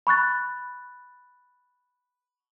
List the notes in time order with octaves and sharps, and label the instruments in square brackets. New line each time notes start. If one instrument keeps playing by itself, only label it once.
[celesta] B5 C#6 F#6 A6